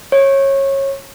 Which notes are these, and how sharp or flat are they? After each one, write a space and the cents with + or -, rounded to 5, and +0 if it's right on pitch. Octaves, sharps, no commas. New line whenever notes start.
C#5 -20